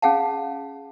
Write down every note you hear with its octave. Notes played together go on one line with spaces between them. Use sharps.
C#4 G#4 F5 F#5 A5